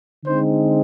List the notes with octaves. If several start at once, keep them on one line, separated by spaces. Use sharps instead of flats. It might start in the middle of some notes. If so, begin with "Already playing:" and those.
D3 G#3 C4 D#4 C5